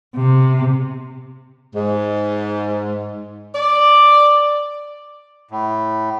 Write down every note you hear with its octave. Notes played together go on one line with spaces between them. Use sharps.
C3
G#2
D5
A2